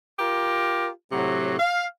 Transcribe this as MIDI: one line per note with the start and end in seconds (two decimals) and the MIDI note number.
0.20 0.88 65
0.20 0.88 67
0.20 0.88 70
1.12 1.58 45
1.12 1.58 48
1.12 1.58 54
1.59 1.86 77